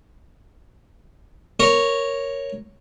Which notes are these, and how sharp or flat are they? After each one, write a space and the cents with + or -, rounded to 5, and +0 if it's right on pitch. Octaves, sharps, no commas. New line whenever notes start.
A#4 +0 C#5 -5